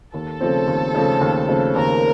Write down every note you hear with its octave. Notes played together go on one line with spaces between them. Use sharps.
D#2 A4
C#3 F3 A3 C4
D#2
C#3 F3 A3 C4
D#2
C#3 F3 A3 C4
D#2 A#4